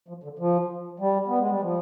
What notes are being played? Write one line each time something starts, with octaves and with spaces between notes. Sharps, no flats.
F3
D3
F3
G3
B3
G#3
G3
F3